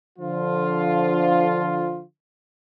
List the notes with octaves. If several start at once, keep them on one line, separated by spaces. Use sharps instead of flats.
D3 F3 F4